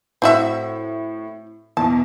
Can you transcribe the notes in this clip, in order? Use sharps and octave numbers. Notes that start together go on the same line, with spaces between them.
A2 C4 F#4 E5
E2 B2 A5